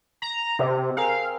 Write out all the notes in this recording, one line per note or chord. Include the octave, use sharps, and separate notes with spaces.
A#5
C3 C4
G#4 A#4 F5 G5